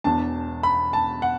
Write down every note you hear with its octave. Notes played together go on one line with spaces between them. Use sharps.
E1 E2 B2 B3 D4 A5
B5
A5
F#5